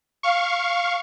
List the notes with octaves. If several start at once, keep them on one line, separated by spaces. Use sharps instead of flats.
F5 C#6